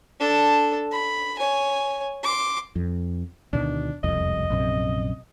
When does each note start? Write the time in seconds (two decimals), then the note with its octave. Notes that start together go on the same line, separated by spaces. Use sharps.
0.20 D4 A4
0.92 B5
1.39 C#5 G#5
2.24 C6 D6
2.76 F2
3.53 D2 B2 D#3 D4
4.04 E1 C2 F2 D#5
4.50 A#1 F#2 C3